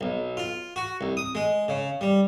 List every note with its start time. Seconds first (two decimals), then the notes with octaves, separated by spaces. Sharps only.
0.01 B1
0.37 F4
0.76 F#4
1.01 C2
1.17 D#6
1.35 G#3
1.68 C#3
2.01 G3